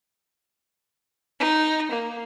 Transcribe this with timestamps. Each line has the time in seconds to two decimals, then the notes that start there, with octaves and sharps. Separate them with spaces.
1.40 D#4
1.91 A#3